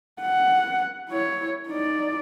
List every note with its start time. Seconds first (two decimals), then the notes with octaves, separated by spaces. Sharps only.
0.22 F#5
1.10 E4 C#5
1.68 D#4 D5